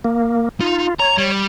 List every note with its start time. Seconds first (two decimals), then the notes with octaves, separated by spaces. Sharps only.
0.04 A#3
0.60 D#4 F4
0.99 C#5 A#5
1.18 G3